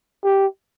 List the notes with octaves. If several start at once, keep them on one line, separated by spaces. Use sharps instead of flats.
G4